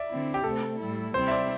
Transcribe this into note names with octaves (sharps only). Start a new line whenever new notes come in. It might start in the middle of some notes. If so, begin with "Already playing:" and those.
Already playing: D5 E5
D3 C4 E4
G4
C3 A3 C4 A4
A2 G3 E4
C3 G3 C4 E4 C5
E5
D5